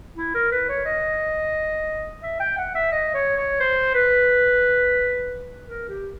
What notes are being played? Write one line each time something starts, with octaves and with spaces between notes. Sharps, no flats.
E4
A#4
B4
C#5
D#5
E5
G5
F#5
E5
D#5
C#5
C#5
C5
B4
A#4
G4